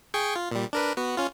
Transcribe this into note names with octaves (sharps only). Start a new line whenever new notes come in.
G#4 G5 C#6
F4
A#2 G3
D4 A#4 B4
B3 F#4
C#4 F4